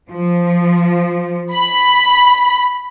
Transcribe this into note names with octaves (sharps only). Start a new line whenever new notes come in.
F3
B5